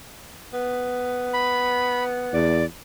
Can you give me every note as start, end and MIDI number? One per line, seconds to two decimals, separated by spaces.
0.53 2.51 59
1.33 2.04 83
2.33 2.63 40
2.33 2.65 74